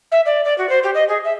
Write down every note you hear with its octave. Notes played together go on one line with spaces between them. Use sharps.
E5
D5
D5
F#4
C5
G4
D#5
G#4
E5